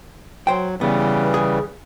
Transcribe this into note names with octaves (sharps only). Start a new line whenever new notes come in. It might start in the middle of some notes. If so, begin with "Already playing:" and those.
F#3 C5 G5
C#3 E3 G3 B3
G#4